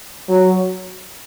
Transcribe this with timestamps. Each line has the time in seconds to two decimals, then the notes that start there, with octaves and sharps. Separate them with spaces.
0.29 F#3